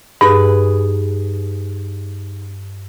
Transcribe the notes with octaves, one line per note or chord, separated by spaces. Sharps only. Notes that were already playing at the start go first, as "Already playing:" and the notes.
G2 D#4 G#4 B4